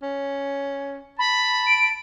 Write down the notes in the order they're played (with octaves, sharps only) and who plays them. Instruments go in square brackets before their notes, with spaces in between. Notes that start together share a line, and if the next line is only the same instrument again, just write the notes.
[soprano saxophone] C#4
[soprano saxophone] A5 [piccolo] B5
[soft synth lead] D7